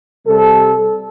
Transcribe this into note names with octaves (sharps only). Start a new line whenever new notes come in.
C3 G3 A4